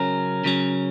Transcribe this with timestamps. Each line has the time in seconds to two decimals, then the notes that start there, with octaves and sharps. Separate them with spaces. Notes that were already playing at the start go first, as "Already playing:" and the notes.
Already playing: C#3 F#3 C#4 A#4
0.44 C#3 F#3 C#4